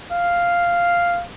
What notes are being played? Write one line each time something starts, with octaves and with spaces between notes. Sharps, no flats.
F5